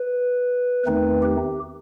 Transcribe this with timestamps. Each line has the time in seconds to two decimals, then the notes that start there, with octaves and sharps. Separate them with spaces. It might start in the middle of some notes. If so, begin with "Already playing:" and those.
Already playing: B4
0.86 E2 D#3 A3 C4 D#4 B4
1.22 G4